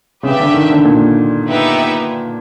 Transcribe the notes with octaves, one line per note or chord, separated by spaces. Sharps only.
C#3 G4 B4 E5
D3
D#3
D3
A#2
B3 D#4 G4 B4 E5